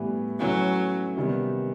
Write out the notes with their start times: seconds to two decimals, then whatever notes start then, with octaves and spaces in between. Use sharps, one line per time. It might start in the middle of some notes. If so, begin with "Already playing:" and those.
Already playing: A2 E3 G3 B3
0.39 E3 F#3 A3 C#4 E4
1.17 C3 D#3 G3 B3